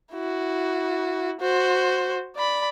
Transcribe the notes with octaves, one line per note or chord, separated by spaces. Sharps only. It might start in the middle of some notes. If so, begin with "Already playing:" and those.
E4 F#4
F#4 C5
D5 B5